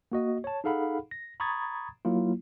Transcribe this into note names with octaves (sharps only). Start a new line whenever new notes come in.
A#3 F#4 D#5
C#5 A5
D#4 G#4 A4 F5 F#5 B5
A#6
A#5 B5 C#6 D#6 G#6 A6
F#3 A#3 E4 F4